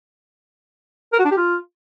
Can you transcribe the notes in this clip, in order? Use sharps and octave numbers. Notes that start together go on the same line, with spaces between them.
A#4
F#4
D4
G4
F4